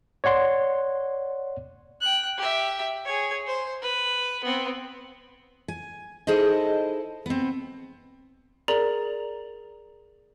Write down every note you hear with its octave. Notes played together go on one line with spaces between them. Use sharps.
C#5 D5 F#5 C6
G5 F#6
G4 E5
G#4 C#5
C5
B4
B3 C4
G#5
D#4 E4 G#4 A4 C5 D#5
B3 C4
G#4 A#4 D5 A#5 F7 F#7